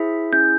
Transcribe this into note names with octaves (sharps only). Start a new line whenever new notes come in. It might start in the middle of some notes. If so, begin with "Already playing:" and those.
Already playing: E4 G#4 C5 E5
C#4 E4 G#4 G6